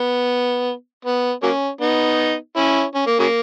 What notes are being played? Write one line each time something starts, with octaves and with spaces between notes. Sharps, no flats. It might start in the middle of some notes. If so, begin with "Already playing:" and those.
Already playing: B3
B3
F#3 A#3 C#4
B3 D#4
C#4 E4
C#4
A#3
C#3 F#3 A#3